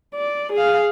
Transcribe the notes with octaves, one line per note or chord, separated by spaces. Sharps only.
D5
G#4 F5